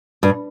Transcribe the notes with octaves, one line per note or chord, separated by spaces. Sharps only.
G2